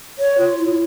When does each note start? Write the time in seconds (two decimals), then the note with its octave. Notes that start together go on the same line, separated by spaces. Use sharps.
0.19 C#5
0.38 F4
0.58 E4